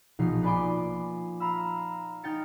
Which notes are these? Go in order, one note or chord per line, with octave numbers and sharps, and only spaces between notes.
A#1 B2 F3 D#4 C7
B4 D5 G#5 B5 C6 D6
F5 A#5 B5 E6
D#4 G5 F6 A6 C#7